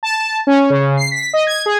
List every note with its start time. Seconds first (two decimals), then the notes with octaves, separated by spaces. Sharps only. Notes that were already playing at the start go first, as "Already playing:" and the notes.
0.03 A5
0.47 C#4
0.70 C#3
0.97 C7
1.11 B6
1.33 D#5
1.47 G#6
1.66 G#4